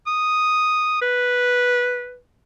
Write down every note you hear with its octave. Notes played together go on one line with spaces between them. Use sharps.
D#6
B4